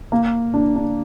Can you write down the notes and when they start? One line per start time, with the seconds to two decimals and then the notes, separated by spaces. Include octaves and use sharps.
0.12 A#3
0.54 D4
0.76 D4